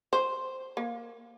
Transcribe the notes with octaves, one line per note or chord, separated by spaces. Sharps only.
C5
A#3